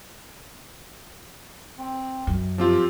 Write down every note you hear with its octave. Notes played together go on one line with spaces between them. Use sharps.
C4
F#2
F3 C4 F4 G4